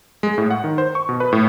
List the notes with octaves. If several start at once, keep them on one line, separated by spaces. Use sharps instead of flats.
G#3
A2
F#5
D#3
C5
C#6
B2
B4
A2